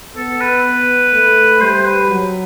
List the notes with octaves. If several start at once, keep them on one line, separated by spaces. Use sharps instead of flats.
B3 A4
B4
A3
G3 C5
B4
F#3